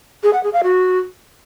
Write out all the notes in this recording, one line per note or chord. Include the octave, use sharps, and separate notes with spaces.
G#4
F#5
G#4
F5
F#4